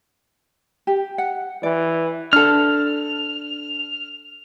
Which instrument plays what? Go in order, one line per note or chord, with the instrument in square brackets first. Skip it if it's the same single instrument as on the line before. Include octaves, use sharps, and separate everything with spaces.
[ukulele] G4
F#5
[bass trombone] E3 [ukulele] D5
[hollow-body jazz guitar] D4 A4 [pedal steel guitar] F6